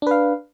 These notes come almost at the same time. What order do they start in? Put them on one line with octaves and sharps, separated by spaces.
D4 B4 F5